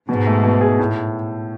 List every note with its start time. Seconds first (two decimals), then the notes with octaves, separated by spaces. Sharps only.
0.09 G#2 B2
0.27 A3
0.44 B2
0.61 G#4
0.79 A2